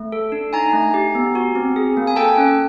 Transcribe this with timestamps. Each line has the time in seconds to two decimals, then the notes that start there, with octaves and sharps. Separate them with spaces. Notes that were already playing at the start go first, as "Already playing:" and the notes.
Already playing: A3
0.12 A4
0.32 D4
0.53 D#4 G#5 A#5
0.73 A3
0.94 G4
1.15 B3
1.35 F#4
1.55 C4
1.76 G#4
1.97 A#3
2.07 G#5
2.16 A4 G5 A5
2.38 C#4